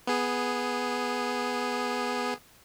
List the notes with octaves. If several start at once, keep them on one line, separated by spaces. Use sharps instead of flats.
B3 G#4